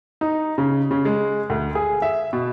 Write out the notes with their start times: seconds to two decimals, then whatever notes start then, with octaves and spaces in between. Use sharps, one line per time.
0.21 D#4
0.58 C#3
0.91 C#3
1.05 G#3
1.50 D2
1.75 G#4
2.02 E5
2.33 B2